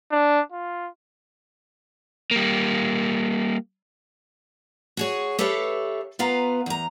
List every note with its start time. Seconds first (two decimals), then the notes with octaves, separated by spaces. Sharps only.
0.12 D4
0.52 F4
2.31 G3 A#3
4.97 F#4 G#4 C#5
5.39 G4 A4 B4 C#5 E5 F5
6.19 B3 F4 B4 F5 A#5
6.66 E2 A#5